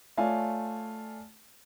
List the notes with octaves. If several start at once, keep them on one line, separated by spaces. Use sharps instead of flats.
A3 F4 C#5 D5 F5 G#5